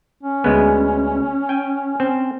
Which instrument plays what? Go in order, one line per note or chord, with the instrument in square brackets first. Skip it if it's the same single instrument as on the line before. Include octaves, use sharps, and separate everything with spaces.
[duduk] C#4
[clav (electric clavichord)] D2 G#3 B3
G5 G#5
C4